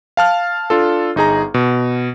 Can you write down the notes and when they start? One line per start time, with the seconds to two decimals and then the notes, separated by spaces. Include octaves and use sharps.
0.17 F5 A5 F6
0.70 D4 F4 A4
1.16 G1 D#4 G#4 A#5
1.54 B2